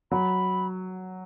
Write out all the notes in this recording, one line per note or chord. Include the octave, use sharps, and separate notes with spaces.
F#3 B5